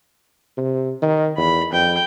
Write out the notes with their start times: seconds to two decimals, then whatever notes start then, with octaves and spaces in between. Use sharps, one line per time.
0.57 C3
1.02 D#3
1.37 E2 B5
1.72 F2 G5